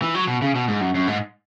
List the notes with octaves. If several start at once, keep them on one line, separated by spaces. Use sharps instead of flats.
E3
F#3
B2
C#3
B2
G#2
F#2
F#2
G#2